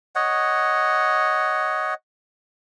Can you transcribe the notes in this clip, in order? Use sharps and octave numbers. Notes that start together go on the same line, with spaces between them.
C#5 D#5 F#5